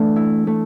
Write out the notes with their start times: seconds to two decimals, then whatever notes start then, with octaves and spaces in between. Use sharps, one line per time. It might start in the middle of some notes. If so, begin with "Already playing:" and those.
Already playing: E3 A3 D4
0.16 E4
0.47 A3